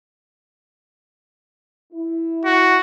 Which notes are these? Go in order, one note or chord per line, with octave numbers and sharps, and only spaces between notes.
E4
F#4